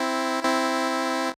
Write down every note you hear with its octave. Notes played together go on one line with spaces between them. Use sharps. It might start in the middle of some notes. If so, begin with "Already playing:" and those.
Already playing: C4 E4
C4 E4